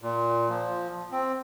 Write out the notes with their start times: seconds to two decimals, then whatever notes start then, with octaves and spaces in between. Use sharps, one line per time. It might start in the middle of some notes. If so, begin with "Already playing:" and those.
0.02 A#2
0.50 F3
1.12 C4